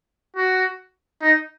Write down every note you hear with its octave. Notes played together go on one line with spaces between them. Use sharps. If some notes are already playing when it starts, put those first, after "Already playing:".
F#4
D#4